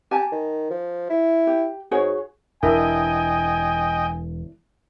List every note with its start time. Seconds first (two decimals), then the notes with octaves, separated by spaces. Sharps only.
0.11 G4 G#5 A5
0.32 D#3
0.71 F3
1.10 E4
1.47 G4
1.91 G#2 F#4 G#4 C#5
2.63 E1 D4 E4 A#4 D#5 G5 G#5